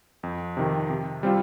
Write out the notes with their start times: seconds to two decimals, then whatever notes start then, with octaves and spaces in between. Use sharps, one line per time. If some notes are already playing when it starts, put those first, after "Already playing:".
0.23 F2
0.57 C3 D#3
0.90 C3
1.23 G3 C4 F4